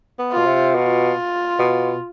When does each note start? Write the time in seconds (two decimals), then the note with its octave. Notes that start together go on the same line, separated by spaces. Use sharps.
0.19 B3
0.32 F4
0.38 B2
0.46 C3
0.75 B2 F4
1.59 B2